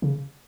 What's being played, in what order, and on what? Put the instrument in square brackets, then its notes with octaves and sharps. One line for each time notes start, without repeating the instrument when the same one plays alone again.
[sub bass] C#3